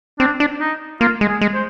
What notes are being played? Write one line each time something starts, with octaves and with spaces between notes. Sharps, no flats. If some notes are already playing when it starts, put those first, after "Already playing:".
C4 D4
D4
D#4
A#3 F4
G#3
G#4
G#3
C5